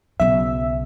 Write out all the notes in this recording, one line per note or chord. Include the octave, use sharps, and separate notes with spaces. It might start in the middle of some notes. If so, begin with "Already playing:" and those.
B1 C#3 E5